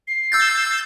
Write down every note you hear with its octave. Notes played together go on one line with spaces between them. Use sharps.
C7
E6 G6 A6